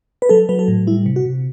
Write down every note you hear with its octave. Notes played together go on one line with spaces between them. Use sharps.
B4
F#3 A4
F#3 B4
A4
A2
G3 E4
C3
F#4
C3